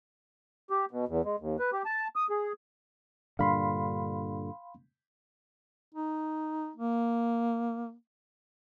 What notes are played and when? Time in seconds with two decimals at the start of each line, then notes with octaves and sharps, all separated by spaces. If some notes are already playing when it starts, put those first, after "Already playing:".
0.70 G4
0.91 B2
1.08 E2
1.25 G#3
1.40 D#2
1.59 B4
1.72 G4
1.85 A5
2.16 D#6
2.30 G#4
3.39 G2 A#2 D3 F5 B5 C6
5.94 D#4
6.76 A#3